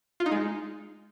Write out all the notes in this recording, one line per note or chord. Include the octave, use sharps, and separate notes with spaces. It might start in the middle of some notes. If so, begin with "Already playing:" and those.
F4
D#4
G#3